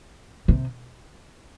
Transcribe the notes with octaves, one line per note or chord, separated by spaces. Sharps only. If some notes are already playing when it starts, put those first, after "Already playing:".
C3